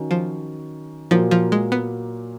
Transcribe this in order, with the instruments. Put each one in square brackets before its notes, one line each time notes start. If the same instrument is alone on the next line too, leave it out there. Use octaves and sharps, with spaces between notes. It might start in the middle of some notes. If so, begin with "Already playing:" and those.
Already playing: [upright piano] D#3 F#3 C#4
[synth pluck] F3
[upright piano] A#2 F#3 A#3 [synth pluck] F3
[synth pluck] F3
G#3
B3